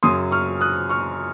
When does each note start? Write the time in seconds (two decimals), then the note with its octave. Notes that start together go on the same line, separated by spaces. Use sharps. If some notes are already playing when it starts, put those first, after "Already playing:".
0.03 F#2 C#3 F#3 C6 D#6
0.31 C#6 F6
0.61 D#6 F#6
0.89 C#6 F6